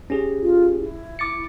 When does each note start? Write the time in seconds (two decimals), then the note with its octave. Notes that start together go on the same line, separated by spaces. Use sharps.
0.10 C#4 G4 G#4
0.42 F4
0.79 E4
1.19 D6 A6 C#7